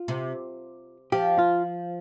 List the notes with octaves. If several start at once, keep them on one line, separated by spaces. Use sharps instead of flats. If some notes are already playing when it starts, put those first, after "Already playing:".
Already playing: F4
C3
F3 G4
F4